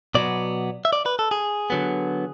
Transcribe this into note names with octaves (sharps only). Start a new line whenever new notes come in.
B2 F#3 B3 D5
E5
D5
B4
A4
G#4
D3 F#3 B3